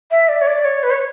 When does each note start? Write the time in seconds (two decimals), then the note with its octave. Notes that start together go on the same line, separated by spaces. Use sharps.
0.11 E5
0.29 D5
0.41 C#5
0.47 D5
0.65 C#5
0.83 B4
0.91 C#5